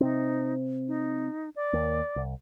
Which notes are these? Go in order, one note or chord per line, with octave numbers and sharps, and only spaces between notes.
C3 C4 D#4
D#4
D5
D#2 A#3
C2